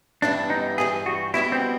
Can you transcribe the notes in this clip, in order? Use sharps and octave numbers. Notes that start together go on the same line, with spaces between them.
G2 E3 G3 B3 D4 E4
D#4
G2 E3 G3 G#4
F#4
E2 B2 G3 B3 E4
C4